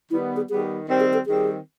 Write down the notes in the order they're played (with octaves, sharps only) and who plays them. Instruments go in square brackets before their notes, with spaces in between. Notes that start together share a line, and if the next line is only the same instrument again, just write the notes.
[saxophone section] D#3 G3 B3 [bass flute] E4
[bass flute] G#4
[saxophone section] D#3 G3 B3 [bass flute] G#4
[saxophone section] D#3 G3 C4
[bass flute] G#4
A4
[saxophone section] D#3 G3 C4 [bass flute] G#4